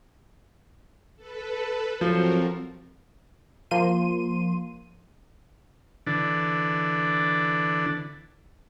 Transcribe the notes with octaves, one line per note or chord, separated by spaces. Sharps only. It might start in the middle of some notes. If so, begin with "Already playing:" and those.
A4 B4
F3 F#3 C4 F#4 A4 A#4 C5
F3 A#3 C6 D#7
D3 E3 D4